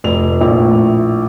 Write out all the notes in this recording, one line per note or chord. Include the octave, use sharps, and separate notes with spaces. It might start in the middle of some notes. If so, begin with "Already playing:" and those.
F1 F7
A#1 A2